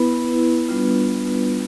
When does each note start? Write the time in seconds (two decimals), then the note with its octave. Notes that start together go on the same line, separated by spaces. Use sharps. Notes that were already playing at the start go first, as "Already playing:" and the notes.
Already playing: B3 E4 B4
0.27 B3 E4
0.69 G3 B3 D4 F4